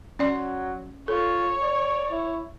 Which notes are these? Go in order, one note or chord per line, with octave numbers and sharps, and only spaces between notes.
F#3 C#4 D5 C6
F4 A4 C#5
D5
E4